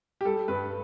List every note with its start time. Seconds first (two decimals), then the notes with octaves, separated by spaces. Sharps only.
0.21 G4
0.25 G3 A4
0.48 G2 B4